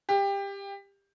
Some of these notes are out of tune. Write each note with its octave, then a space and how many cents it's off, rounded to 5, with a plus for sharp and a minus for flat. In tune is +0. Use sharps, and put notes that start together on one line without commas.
G4 +20